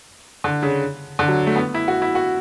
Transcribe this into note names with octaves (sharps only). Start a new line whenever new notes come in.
D3
C#3
D3
F#3
A3
B3
E4
F#4
E4
F#4